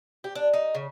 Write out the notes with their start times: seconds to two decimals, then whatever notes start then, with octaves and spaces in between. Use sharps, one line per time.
0.24 G4
0.35 D4
0.53 D#4
0.75 C#3